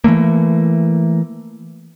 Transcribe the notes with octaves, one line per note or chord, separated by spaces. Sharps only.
E3 F#3 A3 A#3